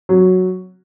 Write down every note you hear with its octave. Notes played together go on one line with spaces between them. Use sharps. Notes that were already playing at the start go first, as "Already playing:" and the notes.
F#3